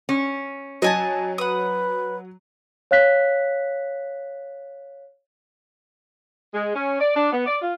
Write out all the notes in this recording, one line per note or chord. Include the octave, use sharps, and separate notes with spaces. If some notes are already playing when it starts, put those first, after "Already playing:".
C#4
F#3 D#5 G#5 A5
B4 F#5 D#6
C#5 F5 F#6 B6
G#3
C#4
D5
D4
B3
D5
F4